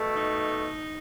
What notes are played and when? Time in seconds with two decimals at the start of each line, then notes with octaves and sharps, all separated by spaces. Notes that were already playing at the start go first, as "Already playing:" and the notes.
Already playing: B2 A3
0.15 D#4